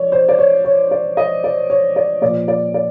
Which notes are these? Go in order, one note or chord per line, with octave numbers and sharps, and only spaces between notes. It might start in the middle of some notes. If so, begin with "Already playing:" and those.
Already playing: F3 C#5 D5
C5
D5
C#5
C#5
D5
D#5
D5
C#5
D5
A#2 F3 D5
D5
D5